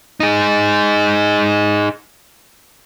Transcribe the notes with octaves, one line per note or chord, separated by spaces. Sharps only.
D#4 G#4